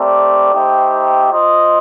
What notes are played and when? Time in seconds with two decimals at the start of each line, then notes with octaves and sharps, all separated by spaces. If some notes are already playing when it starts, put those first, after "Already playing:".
Already playing: A3 C4 G4 A#4 D5
0.53 A3 D#4 G4 C5 G5
1.31 F4 C5 D#5